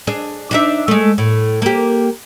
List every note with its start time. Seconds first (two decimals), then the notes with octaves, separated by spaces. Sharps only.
0.07 D4 G#4
0.51 D4 D#4 E5
0.88 G#3 A3
1.18 A2
1.62 A#3 G4